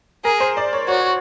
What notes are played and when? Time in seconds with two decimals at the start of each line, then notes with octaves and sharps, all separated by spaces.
0.25 G#4 A#4
0.40 C5
0.57 D5
0.73 C#5
0.88 F#4 C#5